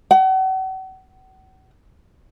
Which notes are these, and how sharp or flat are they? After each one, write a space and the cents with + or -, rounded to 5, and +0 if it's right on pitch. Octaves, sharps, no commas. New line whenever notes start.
F#5 +40